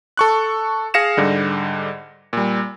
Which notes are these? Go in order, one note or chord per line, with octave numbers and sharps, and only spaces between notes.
A4 C#6 F#6
G#4 F5 A#6 C#7 E7
G#2 D3 G3
A#2 G3